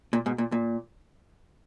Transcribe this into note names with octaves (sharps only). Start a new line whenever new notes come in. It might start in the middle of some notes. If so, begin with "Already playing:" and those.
A#2
G#2 B2
A#2
A#2